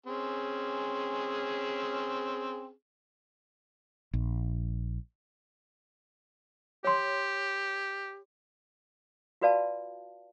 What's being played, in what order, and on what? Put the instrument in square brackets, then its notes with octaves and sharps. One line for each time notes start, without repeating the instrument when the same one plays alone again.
[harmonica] C4 C#4 G#4
[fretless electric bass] A#1
[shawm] G4 [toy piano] C#5 C6
[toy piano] F4 F#4 B4 D5 F5 A5